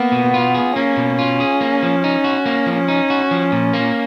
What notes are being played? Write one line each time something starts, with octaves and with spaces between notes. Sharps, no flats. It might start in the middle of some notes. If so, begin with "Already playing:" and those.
Already playing: A#3 B3
B2
F4
G#4
A#3 C#4
B2
F4
G#4
A#3
F3
D#4
F#4
A#3
F3
D#4
F#4
F3
A#2
A#3